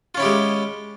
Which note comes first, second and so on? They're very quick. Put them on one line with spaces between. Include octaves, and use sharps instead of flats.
F4 C#4 E4 G4 G#3